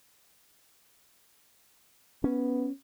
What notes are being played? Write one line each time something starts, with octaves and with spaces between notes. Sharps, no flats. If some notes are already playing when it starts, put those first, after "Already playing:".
B3 C#4